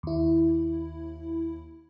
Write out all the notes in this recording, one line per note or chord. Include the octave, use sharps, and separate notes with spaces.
D#2 E4